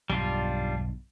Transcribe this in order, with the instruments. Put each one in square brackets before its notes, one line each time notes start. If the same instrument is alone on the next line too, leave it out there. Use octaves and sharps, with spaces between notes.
[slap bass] B1 E2 G2 [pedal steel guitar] G3 D4 F4